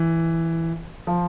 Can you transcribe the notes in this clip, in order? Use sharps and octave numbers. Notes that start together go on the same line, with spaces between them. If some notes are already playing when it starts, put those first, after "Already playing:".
Already playing: E3
F3